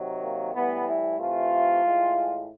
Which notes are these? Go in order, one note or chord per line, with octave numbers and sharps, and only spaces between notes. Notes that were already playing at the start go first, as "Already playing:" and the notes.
Already playing: C3 D#3 F#3
A#3
A2 E3 G3 B3
E4
C3 E3 A3 F4
A2 E3 G#3